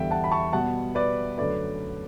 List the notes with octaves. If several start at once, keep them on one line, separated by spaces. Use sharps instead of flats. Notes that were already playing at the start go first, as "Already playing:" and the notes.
Already playing: E2 D3 G3 B3 E5 G5
F#5 A5
B5
A5 C#6
B2 G3 B3 F#5 A5
B4 D5
F#2 D3 A3 B4 D5